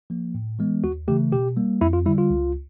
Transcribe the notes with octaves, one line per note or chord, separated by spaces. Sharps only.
F3 A#3
A2
E3 G#3 B3
D#2 F#4
C#3 E3 A3 G4
B2 G4
G3 A#3
F2 E4
F4
D3 G3 E4
F4
C#2